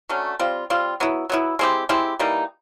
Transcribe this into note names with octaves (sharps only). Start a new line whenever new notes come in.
D3 F#3 A3 C#4
G3 C4 F4
G3 C4 F4
F#3 B3 E4
F#3 B3 E4
G#3 C4 E4 G4
G#3 C4 E4 G4
E3 G3 A#3 D#4